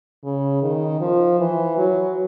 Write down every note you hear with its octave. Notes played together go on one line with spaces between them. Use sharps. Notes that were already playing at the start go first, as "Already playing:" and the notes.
C#3
D#3
F3
E3
F#3